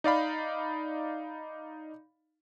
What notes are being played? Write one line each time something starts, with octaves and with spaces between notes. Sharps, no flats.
D#4 D5 F5 B5